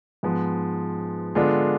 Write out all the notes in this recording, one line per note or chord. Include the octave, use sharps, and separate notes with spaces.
G#2 F3 G#3 B3
D3 G#3 B3 D4 F4